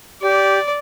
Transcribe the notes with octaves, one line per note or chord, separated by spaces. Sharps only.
G4 D5